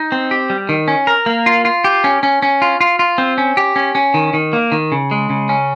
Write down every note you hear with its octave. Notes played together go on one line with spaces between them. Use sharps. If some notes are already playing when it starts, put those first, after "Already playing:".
Already playing: D#4
C4
G4
G3
D#3
C#4
A#4
A#3
F4
F4
G4
C#4
C#4
C#4
F4
F4
F4
C4
C#4
G4
C#4
C#4
D#3
D#3
A#3
D#3
C#3
G#3
C#3
C#4